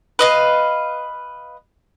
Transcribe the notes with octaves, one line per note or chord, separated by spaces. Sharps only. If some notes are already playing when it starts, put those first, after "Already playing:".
B4 D#5 F5